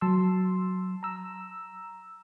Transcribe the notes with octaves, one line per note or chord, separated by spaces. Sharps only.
F#3 A5 C6 E6
A#5 E6